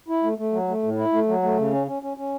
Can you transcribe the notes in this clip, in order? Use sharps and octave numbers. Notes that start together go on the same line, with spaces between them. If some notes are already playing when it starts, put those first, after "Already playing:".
E4
A3
A3
F#3
A3
A2
E4
A3
F#3
A3
C#3
C#4
C#4
C#4
C#4